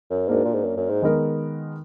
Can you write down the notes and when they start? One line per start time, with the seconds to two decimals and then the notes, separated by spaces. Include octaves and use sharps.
0.10 F#2
0.28 G#2 A#3 D4 F#4 A#4
0.45 A#2
0.55 G#2
0.64 F#2
0.77 F#2
0.90 G#2
1.02 D#3 G#3 B3 D#4 A#4